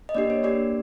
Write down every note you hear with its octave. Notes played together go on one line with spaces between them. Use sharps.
D#5
A#3 D4 G4 D5
C#5
A#3 D4 G4 D5